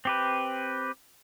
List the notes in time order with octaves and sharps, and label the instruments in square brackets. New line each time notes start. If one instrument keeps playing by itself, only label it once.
[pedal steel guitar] C4 G4 B4